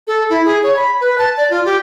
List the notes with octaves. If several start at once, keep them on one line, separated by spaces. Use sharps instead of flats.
A4
E4
G#4
C#5
B5
B4
A5
D5
F4
G4